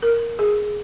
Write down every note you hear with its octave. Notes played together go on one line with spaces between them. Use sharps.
A#4
G#4